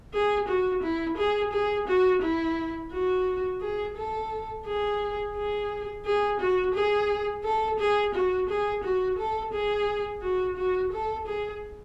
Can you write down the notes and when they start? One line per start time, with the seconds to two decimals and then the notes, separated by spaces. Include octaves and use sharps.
0.13 G#4
0.48 F#4
0.82 E4
1.17 G#4
1.53 G#4
1.88 F#4
2.22 E4
2.92 F#4
3.61 G#4
3.97 A4
4.66 G#4
5.35 G#4
6.05 G#4
6.40 F#4
6.74 G#4
7.44 A4
7.79 G#4
8.14 F#4
8.49 G#4
8.84 F#4
9.18 A4
9.53 G#4
10.22 F#4
10.57 F#4
10.92 A4
11.27 G#4